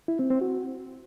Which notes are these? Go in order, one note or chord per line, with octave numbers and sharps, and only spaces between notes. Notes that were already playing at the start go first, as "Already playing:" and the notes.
E4
C4
C4
F#4